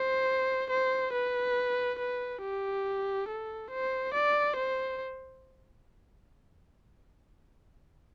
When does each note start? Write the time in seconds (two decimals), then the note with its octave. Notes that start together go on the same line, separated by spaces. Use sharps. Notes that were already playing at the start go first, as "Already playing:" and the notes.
Already playing: C5
0.70 C5
1.13 B4
1.98 B4
2.42 G4
3.28 A4
3.70 C5
4.13 D5
4.56 C5